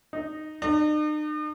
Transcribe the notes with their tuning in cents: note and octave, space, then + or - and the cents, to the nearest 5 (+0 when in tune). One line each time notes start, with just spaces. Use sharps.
D#4 -10
D#4 -45